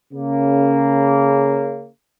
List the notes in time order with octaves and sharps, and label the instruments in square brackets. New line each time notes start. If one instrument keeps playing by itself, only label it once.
[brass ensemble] C#3 A#3